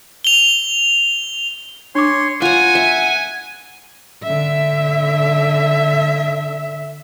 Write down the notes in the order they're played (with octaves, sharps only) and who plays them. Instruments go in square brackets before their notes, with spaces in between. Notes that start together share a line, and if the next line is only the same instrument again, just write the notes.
[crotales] F7 G7
[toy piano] D4 D6 [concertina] C#5 C6
[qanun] F4 A#5 [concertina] F#5 [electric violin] G#5
[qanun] E5
[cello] D3 E5